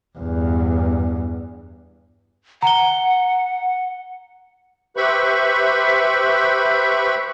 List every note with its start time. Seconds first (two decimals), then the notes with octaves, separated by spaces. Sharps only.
0.19 E2 G2
2.63 F#5 A#5 G7
4.97 G4 B4 C5 E5 B5 C#6